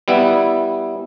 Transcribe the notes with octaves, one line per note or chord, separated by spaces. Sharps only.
G3 B3 E4